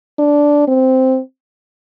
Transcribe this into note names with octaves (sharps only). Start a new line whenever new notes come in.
D4
C4